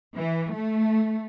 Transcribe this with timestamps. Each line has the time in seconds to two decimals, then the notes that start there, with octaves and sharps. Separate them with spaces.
0.17 E3
0.54 A3